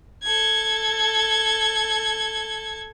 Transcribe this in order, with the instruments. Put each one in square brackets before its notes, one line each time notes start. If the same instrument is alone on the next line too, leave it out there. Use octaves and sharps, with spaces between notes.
[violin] A4 G#6